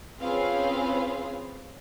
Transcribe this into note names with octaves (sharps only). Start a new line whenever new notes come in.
C4 C#4 F4 G#4 B4 F5